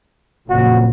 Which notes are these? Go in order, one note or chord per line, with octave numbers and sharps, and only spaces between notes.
F#1 F2 A#2 F#4